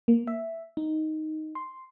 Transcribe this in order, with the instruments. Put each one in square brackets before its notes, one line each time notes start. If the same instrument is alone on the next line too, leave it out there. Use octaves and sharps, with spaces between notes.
[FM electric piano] A#3
E5
D#4
C6